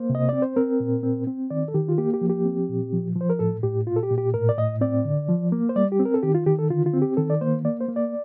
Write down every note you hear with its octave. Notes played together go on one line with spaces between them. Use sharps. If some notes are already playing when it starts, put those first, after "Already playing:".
Already playing: A#3 C5
C3
D#5
C4 D5
C5
C4 A#4
A#2
C4
C4
D#3 D5
A4
D#3 G4
F4
A#3 G4
G4
F3
G4
C4
A#2
F3
F3 C5
A#4
A2 A4
A2 G4
A#2 F4
A4
G4
A#2
G4
A2 A#4
D5
A2 D#5
C4 D5
D3
F3
A#3
C5
G3 D5
G4
C4
A#4
A4
D#3 G4
F4
D#3 G4
A4
D3 F4
F4
C4
G4
D#3 A4
D5
A#3 C5
A#3 D5
C5
A#3
D5